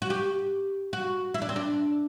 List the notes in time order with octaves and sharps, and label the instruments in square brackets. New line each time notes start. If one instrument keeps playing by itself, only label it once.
[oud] F#4
G4
F#4
E4
D4
C4
D4